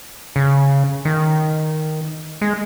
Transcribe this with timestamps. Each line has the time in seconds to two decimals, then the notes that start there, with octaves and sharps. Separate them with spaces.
0.36 C#3
1.05 D#3
2.41 G#3